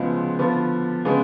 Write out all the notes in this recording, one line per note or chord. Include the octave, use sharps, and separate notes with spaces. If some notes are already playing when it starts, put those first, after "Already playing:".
Already playing: D2 C#3 F3 G#3 B3
D3 F3 B3 F4
C#3 G#3 B3 D4